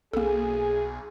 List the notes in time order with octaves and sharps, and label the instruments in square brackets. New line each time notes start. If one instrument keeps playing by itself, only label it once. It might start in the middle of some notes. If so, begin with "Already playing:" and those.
[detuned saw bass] B1 [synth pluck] A#3 A4 [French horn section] G#4